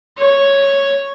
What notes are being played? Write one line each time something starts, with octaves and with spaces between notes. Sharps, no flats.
C#5